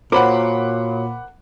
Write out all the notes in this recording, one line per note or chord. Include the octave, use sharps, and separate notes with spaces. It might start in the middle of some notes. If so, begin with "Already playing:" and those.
A#2 F#4 A#4 C5 C#5 F#5 B5 D6